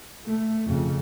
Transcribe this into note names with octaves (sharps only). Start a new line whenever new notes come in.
A3
F2 C#3